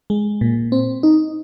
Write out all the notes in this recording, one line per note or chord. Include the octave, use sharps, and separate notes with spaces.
G#3
A#2
C4
D#4